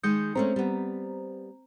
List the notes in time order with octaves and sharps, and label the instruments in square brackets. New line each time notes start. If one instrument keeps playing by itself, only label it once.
[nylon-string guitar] D#3 G#3 [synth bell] D#6 G6 C#7
[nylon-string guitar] G#3 A3 C#4 [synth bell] C4 C5 A#5
[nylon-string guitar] G3 B3